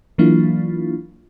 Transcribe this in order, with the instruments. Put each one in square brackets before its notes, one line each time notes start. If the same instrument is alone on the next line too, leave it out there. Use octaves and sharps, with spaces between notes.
[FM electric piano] E3 F#3 A#3 D4 E4 F4